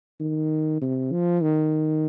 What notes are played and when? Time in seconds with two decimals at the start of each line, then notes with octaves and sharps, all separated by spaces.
0.20 D#3
0.81 C3
1.12 F3
1.42 D#3